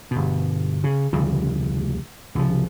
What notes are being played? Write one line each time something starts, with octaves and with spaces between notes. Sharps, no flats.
G1 B2
C#3
F1 D2 C#3 G3
C2 C#3 E3 F3